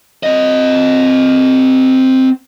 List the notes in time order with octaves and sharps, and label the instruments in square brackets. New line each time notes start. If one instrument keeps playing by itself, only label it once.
[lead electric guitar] C4 D#5